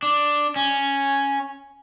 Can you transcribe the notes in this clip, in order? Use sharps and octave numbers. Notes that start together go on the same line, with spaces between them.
D4
C#4